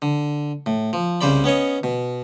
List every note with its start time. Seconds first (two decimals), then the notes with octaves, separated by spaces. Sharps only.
0.02 D3
0.66 A2
0.93 F3
1.21 C2 C#3 C5 D5 B5
1.44 B3 C#4 C#5 D#5
1.83 B2